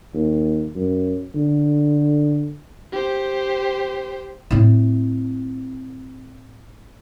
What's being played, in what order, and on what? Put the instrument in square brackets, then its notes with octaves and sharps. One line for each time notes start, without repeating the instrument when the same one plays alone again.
[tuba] D#2
F#2
D3
[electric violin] G4 C5
[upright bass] A2 C4